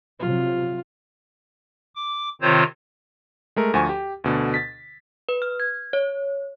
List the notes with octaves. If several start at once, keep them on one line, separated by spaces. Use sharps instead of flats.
C3 F3 F#3 F4
D6
C3 D#3 C4 F4 C5 C#5
G#3 A3 A#4
D2 F3 G#5 C#6
G4
D2 B2 D3
A6 B6
B4
F6
G#6
C#5